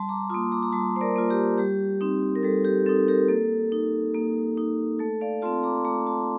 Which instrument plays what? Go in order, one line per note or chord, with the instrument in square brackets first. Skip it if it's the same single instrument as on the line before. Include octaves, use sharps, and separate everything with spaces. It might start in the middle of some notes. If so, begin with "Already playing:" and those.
Already playing: [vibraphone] G3 A5 C6
A#5 D6
A#3 F4 C6 D#6
A#5 D6
A#5
G3 A5 C6
C5
A#4 D5
A#3 F4
G4
G3 G4
C4 D#4
A#4
G3 A4
G4
C4 D#4 A4
G4 A#4
A#3 A4
D#4
A#3
D#4
A3 A4
D5 F5
C4 F4 A5 C6
A#5 D6
C6
A3 A#5 D6
A5 C6